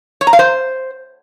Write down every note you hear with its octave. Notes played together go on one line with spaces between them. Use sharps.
C#5
A#5
F5
C5